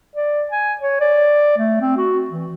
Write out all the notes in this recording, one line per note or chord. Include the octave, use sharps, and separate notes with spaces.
D5
G#5
C#5
D5
A3
C4
F#4
E3